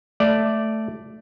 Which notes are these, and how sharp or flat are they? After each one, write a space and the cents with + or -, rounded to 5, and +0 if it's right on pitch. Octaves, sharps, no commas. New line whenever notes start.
A3 +0 D5 +0